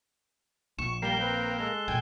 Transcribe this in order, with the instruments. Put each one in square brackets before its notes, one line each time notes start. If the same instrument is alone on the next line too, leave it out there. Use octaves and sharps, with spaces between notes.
[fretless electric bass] A#1 [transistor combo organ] C#6 [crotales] E7
[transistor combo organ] G3 A#3 [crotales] C7 G7
[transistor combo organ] A#3 [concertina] C4 B4 G5
[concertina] G#3 A4 F#6
[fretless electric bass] A#1 A#2 [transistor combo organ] G5 G#5